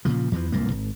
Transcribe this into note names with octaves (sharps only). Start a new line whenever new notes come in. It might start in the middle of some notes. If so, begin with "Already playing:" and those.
A#2 C#3 F3
E2 E3 F3
D1 C2 G#2 A#3
G#1